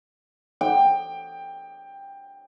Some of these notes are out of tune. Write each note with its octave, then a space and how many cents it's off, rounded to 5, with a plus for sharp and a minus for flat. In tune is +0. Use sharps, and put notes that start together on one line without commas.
G5 +15